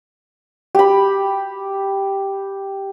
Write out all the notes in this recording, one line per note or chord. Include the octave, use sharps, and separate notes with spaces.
G4 B5